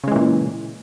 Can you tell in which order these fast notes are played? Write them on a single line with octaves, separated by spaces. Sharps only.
C#3 G#3 E3 A#2